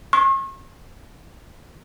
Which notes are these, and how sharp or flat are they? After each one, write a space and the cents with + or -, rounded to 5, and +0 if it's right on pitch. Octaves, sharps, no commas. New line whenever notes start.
C#6 -40